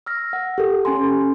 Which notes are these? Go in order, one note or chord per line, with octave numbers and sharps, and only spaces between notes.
E6 F6 A#6
F#5
G4 A4
C#4 G#5 C6